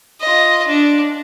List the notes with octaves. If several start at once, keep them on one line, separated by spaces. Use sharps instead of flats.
F4 D#5
D4